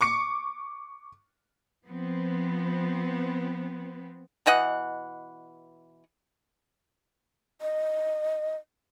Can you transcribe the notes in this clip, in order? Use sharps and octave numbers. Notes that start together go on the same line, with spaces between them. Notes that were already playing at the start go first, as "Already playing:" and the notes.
C#6 D6 C#7
F3 B3 C4
B2 E3 D#5 F#5
D#5